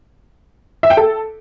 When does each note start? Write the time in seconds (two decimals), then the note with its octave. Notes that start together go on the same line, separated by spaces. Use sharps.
0.83 E5
0.90 G5
0.97 A4